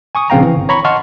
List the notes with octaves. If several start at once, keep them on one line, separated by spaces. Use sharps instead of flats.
G#5 C#6 D#6
A#1 C#3 C4 F5 G5 A#5
E3
G1
C#5 A#5 B5 C#6
D#5 F#5 A5 C6 C#6 F6